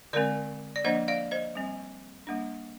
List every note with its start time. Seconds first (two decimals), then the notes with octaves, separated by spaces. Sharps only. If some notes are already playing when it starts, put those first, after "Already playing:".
0.13 D3 G#3 C4 A#4 D5
0.76 D5
0.84 F3 A#3 D4 C5 D#5
1.08 D5 F5
1.31 C5 D#5
1.55 G3 C4
2.27 G3 A#3 D4